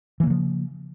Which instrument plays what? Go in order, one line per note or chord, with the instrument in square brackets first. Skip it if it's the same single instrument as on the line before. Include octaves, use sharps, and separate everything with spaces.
[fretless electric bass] E3
A#3
C#3
F3